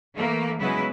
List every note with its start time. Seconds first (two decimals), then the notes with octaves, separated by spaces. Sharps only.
0.13 E3 A3 A#3
0.60 C#3 F#3 G#3 B3 E4 B4